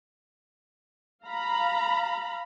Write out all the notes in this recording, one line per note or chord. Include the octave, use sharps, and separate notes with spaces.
F5 A#5 B5